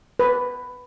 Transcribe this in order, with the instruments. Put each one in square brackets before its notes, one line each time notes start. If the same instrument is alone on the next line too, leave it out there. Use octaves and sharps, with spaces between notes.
[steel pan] B4